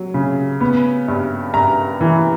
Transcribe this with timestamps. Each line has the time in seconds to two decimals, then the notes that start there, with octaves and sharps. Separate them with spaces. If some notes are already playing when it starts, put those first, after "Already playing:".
Already playing: F#3
0.14 C#3
0.60 B3
1.08 G2
1.53 G2 A#5
2.01 E3